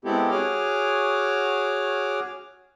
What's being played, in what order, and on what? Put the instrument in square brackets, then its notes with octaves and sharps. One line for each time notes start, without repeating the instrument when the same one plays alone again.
[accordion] G#3 B3 C4 E4 G4 A4
F#4 G#4 C#5 D6 F6